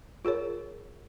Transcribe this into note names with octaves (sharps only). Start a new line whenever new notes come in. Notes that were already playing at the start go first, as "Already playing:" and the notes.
F4 G#4 A#4 C#5